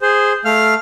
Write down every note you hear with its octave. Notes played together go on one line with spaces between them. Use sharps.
G#4 C5
A3 F5 F6